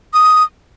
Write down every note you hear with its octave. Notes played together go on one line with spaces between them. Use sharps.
D#6